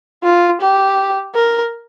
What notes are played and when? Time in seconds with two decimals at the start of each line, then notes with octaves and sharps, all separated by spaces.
0.24 F4
0.61 G4
1.35 A#4